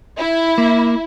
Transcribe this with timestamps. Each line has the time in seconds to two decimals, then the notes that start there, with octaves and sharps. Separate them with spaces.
0.18 E4
0.58 A#3